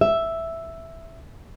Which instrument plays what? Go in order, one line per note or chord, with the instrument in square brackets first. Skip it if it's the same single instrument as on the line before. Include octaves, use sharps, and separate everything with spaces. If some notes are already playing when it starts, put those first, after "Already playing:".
[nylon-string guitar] E5